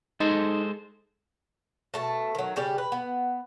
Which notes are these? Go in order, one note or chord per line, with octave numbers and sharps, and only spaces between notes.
G#3 D#4 A4 C5
B2 A3 A5
D#3 F#3
C#3 G3 G4
B4
B3